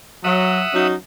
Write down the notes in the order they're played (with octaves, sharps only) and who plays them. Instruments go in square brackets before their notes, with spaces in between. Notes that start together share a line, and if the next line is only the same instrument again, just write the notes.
[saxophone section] F#3 [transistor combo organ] E5 F#5 D#6
[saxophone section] F#3 C#4 D#4